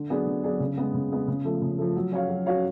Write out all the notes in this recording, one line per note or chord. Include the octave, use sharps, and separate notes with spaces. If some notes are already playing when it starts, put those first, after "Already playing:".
Already playing: D3
F#3 B3 D4 G#4
D3
F#3 B3 D4 G#4
C#3
G#3 B3
C#3
G#3 B3
C#3
F3 A3
C#3
F3 A3
F#3
C#4 F#4 C#5 F5
F#3
C#4 F#4 C#5 F5